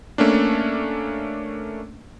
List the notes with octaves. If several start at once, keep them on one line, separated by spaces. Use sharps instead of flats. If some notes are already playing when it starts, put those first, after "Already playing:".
A3 A#3 C#4 D4